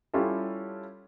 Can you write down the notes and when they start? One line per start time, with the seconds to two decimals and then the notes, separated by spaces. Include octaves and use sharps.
0.14 G3 C#4 E4 F4 G4 A4